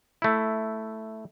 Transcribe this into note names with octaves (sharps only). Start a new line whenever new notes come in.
A3 E4